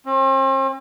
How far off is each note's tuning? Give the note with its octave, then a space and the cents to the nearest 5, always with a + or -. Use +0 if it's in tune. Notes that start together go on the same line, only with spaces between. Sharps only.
C4 +45